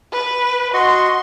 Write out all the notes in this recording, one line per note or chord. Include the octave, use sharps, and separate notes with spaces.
B4
F#4 D#5 C6 C#6